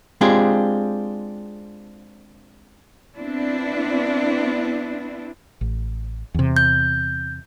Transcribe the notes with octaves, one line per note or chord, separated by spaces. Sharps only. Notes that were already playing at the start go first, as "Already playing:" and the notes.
G#3 C4 D4 F4 G4 G#4
B3 C4 D4 E4
A1
E2 C3
G6